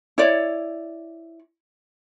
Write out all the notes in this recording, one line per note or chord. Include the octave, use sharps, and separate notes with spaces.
E4 C#5 D5